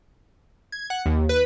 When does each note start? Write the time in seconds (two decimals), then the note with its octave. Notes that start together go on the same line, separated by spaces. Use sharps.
0.72 G#6
0.90 F#5
1.06 D#2
1.29 B4